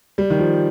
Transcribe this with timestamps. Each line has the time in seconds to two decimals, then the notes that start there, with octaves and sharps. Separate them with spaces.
0.18 G3
0.30 D#3
0.39 F3